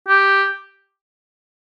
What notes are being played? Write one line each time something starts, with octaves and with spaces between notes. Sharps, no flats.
G4